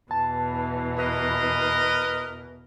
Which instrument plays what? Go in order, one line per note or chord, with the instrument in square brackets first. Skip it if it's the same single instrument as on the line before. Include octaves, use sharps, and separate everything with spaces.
[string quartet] E2 B2 E3 [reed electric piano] A5
[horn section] A#4 B4 D#5